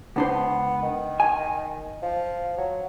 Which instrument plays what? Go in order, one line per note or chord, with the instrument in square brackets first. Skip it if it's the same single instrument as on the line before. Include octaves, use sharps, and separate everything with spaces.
[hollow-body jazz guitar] C#2 D4 C5 [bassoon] B3
[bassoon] D#3
[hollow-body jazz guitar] G#5
[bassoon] F3
F#3